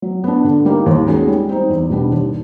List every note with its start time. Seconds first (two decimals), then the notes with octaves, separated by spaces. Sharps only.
0.02 F#3
0.24 B3 D4
0.44 D3
0.65 G3 A#3 D#4
0.86 D#2
1.07 D#3 G#3 C#4 F#4
1.27 G3
1.49 C4 D#4
1.69 E2
1.90 B2 G3 B3 D4
2.11 D#2